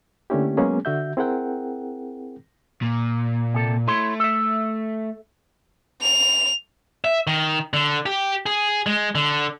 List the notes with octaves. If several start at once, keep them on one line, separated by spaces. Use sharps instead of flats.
D3 A3 A#3 C#4 E4 G4
F#3 G#3 A#3 B3 C#4 G#4
D3 F#4 E5 G6
C4 E4 G#4 A#4 F#5 G5
A#2
C3 A4
A3 E4 C#5 C6
A4 E5
F7
E5
D#3
D3
G4
G#4
G#3
D3